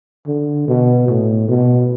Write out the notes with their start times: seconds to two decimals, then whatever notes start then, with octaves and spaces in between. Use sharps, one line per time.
0.27 D3
0.68 B2
1.08 A2
1.48 B2